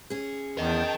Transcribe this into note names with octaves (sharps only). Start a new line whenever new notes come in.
C#4 G#4
E2 A#4 D#5 G5 A5 G6